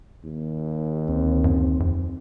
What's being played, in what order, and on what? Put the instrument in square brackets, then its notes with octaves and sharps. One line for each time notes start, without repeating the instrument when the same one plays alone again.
[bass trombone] D#2
[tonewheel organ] D2 C4
[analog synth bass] F#2
F2